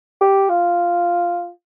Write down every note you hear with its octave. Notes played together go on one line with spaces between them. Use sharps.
G4
F4